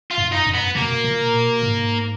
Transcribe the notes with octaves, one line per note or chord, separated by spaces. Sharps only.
F4
F#2
D#4
F#2
B3
B2 A#3
A#2
B2
G#2